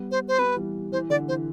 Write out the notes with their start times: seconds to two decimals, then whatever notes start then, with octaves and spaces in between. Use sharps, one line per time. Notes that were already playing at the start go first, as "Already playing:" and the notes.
Already playing: G3 B3
0.11 C5
0.28 C5
0.38 G3 B3 B4
0.56 E3 G3
0.92 E3 C5
1.10 D3 D5
1.28 E3 C5